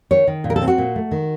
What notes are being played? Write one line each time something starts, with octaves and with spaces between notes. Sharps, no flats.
D#3 C#5
D#3
A#2
A#4
A4
C4
F#4
A#2
A3
D#3